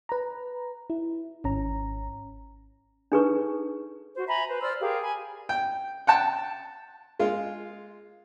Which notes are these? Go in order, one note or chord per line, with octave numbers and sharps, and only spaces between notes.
B4 A#5
E4
G#1 C#4 A#5
D4 D#4 G#4 A4 B4 C#6
F#4 C5
E5 G#5 A#5 B5
B4 C5
C5 D5 E6 F6
G4 G#4 A#4 F5
G#5 B5
G5
F#5 G5 A5
G#3 F4